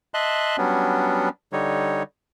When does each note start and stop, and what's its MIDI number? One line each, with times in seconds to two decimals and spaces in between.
0.14 0.56 75
0.14 0.56 76
0.14 0.56 81
0.14 0.56 84
0.14 0.56 90
0.58 1.29 54
0.58 1.29 55
0.58 1.29 59
0.58 1.29 61
0.58 1.29 62
1.53 2.03 50
1.53 2.03 55
1.53 2.03 63
1.53 2.03 73